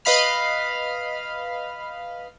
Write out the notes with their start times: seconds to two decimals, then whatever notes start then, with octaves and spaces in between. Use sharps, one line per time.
0.05 B4 D#5 F5 B5 F6